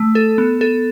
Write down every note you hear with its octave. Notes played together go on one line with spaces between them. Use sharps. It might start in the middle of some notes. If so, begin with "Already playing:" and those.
Already playing: A3
A4
B3
A4